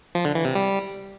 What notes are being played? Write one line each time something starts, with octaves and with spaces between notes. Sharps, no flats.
F3
D3
E3
C3
G3